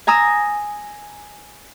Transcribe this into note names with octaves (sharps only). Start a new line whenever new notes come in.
G#5 A#5 D#6 E6